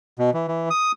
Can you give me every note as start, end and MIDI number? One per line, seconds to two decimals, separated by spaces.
0.19 0.31 47
0.34 0.47 52
0.48 0.69 52
0.70 0.92 87